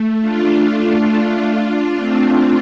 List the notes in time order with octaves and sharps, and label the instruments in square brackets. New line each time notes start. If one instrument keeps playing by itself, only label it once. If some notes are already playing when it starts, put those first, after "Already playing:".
Already playing: [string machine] A3
D4 F4
D4 F4
A3 C4